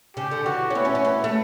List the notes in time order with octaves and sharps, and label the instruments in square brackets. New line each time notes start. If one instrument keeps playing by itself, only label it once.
[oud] C#3 [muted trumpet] G4
[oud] D3
[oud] E3 [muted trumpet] F#4
[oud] C#4
[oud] B3 [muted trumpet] E4
[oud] C#4
C#4
B3
A3